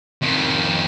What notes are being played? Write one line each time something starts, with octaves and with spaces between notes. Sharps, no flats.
F2 D#3